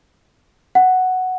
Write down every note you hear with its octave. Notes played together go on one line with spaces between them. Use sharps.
F#5